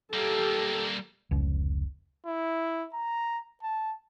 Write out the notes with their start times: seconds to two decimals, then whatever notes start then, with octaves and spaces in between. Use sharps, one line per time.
0.14 G3 A#3 G4 A4
1.31 F1 C#2
2.26 E4
2.94 A#5
3.63 A5